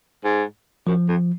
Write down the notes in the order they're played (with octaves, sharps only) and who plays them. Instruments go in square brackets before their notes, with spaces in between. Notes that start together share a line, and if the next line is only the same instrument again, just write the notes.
[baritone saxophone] G#2
[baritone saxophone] F#2 [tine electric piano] F3
[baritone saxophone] F2